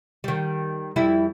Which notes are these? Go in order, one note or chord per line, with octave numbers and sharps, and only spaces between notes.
D#3 G3
F2 G3 E4